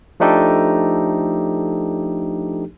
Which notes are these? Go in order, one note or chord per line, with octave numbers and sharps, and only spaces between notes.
F3 A3 D4 D#4 G4 A4